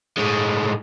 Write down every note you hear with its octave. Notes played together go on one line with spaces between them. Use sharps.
A2 G#3